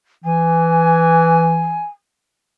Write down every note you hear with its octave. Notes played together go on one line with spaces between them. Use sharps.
E3 G#5